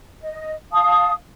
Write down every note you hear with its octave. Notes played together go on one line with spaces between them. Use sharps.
D#5
F5 A5 D#6